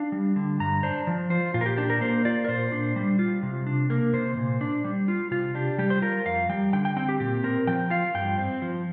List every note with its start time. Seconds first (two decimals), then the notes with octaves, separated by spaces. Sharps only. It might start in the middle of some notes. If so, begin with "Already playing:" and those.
Already playing: D4 F5
0.12 G3
0.36 D3
0.60 G2 A#5
0.83 D4 C5
1.07 F3
1.30 F4 C5
1.54 A#2 F4
1.61 A#4
1.66 G4
1.77 D4 G4
1.90 A#4
2.01 A#3 C5
2.25 F4 D5
2.44 A#4
2.48 A#2 C5
2.72 D4
2.96 G3
3.19 F4
3.43 C3
3.67 D4
3.90 A#3 A#4
4.13 C3 C5
4.37 A#2
4.61 D4
4.84 G3
5.08 F4
5.31 C3 F4
5.55 D4 G4
5.78 G3 G4
5.90 C5
6.02 F4 A#4
6.25 F2 F5
6.49 G3 G5
6.73 D3 G5
6.85 G5
6.97 C4 G5
7.09 G4
7.20 A#2 G4
7.44 C4 A#4
7.67 F3 G5
7.90 F4 F5
8.15 G2 G5
8.38 C4
8.62 F3